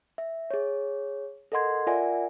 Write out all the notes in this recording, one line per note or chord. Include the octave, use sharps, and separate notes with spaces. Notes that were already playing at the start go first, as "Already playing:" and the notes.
E5
G#4 C#5
A4 A#4 D#5 F#5 C6 G#6
F4 A#4 D5 E5 F#5 G#5